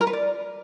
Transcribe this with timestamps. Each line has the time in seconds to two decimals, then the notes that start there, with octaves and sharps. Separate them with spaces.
0.01 A#4
0.07 B4
0.13 D5